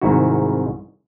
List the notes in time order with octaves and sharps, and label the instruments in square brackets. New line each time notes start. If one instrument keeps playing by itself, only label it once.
[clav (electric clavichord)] C2 G#2 D#3 E4 F#4